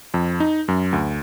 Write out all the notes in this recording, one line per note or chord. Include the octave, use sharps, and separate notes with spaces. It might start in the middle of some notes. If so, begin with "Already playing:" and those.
F2
D#4
F#2
D2